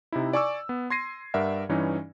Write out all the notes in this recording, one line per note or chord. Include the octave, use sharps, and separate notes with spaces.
C3 D#4 E4
D5 G#5 C#6 D6 E6
B3
C6 G#6 A#6 C7 D#7
G2 A#4 D5 E5 F#5
G2 E3 C#4 D#4